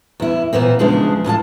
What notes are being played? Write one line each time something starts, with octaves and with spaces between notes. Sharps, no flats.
E2 E4
A#2 E3 B3 C4
E2 C#3 F3 G#3 D4
D#2 A2 F4 A5